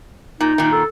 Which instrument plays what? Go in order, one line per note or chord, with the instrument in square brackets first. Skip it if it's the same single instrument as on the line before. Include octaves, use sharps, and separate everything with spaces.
[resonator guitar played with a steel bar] A#2 [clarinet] D#4
[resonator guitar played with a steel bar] A#2 D#3
[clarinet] A4